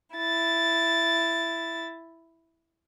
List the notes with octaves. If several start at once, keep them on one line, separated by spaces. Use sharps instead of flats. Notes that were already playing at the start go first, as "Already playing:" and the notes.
E4 A6